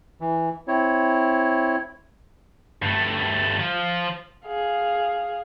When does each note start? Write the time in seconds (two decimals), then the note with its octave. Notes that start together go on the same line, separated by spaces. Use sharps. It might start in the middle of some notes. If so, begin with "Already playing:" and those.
0.20 E3
0.68 C4 E4 C#5
2.82 G2 A3
3.59 F3 F4
4.46 G#4 F5